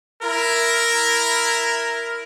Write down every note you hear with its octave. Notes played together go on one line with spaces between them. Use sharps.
E4 A#4